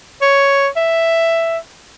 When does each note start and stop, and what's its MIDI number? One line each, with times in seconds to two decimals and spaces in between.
0.21 0.68 73
0.76 1.58 76